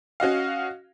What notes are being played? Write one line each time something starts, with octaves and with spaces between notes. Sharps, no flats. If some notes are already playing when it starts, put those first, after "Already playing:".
C#4 F#4 D#5 F5